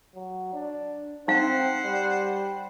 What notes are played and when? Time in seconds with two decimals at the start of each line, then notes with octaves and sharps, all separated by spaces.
0.15 F#3
0.53 D4
1.28 C4 D#4 C5 F5 F#5
1.84 G3